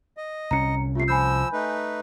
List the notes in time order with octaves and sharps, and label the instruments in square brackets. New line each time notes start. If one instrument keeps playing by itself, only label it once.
[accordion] D#5
[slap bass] C2 C#4 [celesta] A#5 C#7
[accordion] C3 A3 [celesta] F4 C7
[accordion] F3 E6 [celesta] G#5 B5 G6
[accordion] A3 D#4 B4